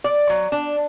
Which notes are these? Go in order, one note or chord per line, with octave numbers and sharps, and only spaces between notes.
D5
F#3
D4